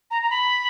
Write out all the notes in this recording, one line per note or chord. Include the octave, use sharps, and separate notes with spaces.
A#5
A#5
B5